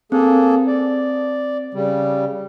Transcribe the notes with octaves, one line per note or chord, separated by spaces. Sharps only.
A#3 C4 G#4 A4
D5
C#3 G3